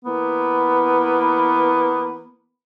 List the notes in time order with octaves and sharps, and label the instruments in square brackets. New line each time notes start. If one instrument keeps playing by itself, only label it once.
[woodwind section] E3 A#3 B3